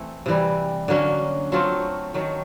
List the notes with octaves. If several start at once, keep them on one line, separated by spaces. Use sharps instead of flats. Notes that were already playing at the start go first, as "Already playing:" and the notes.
Already playing: E3 A3 C4
C3 E3 G3
D3 F#3 A#3 C#4
F#3 A3 C4 F4
D#3 F#3 A3